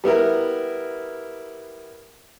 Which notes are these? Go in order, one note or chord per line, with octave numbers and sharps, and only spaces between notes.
G3 B3 E4 A#4